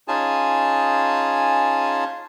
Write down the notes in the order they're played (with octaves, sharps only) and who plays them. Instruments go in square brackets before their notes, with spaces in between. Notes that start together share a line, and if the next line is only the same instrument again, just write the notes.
[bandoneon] C#4 D#4 F4 G#4 G#5 A5